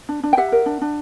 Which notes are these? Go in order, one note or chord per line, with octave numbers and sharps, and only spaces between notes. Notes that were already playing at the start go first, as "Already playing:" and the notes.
D4
D4
G5
G4 E5 F#5
A#4
D4
D4